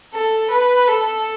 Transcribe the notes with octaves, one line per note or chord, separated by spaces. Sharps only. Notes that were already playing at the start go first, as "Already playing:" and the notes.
A4
B4
A4